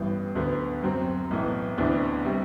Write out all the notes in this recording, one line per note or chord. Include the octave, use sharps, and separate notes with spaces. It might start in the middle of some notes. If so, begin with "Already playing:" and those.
Already playing: A1 G2 E3 B3
D2 D3 F#3 B3
F#2 F#3 C4
B1 A2 E3 B3
D2 C3 E3 B3 D4
C3 G3